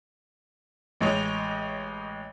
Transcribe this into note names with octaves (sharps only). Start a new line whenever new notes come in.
A1 G#3 C#5 D#5 F7